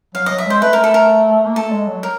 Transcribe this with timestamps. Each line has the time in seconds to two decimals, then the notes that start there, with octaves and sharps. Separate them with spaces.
0.15 F#3 F5
0.26 F#3 D#5
0.38 E5
0.46 G#3 C5
0.62 A3 B4
0.73 A#4
0.84 A4
0.94 A#4
1.46 A#3
1.56 A3 A4
1.72 G#3
1.88 F#3
2.03 A#4